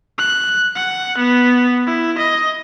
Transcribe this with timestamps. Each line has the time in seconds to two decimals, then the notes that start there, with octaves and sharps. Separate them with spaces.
0.18 F#6
0.75 F#5
1.18 B3
1.87 E4
2.18 D#5